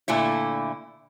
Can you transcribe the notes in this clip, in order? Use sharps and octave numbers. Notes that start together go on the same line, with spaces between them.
A#2 D3 A3 E4